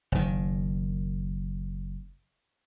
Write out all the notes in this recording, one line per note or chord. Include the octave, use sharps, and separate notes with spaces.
F#1 D#3